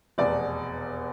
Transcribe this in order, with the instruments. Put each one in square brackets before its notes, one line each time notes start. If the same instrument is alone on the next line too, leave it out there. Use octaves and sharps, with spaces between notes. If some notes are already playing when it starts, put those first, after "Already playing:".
[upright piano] F1 E2 B2 D5